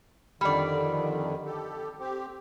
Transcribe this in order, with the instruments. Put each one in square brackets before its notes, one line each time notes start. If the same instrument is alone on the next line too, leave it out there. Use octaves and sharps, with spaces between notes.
[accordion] F2 D3 D#3 [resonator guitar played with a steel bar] G3 D5
[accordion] G4 A4
C4 G4